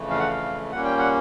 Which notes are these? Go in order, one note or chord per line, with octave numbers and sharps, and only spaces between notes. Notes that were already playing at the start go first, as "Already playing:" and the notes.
Already playing: F2 C#3 E3 A3
F5
F#5
F5
A#2 G3 A#3 C#4 F#5
G5
F#5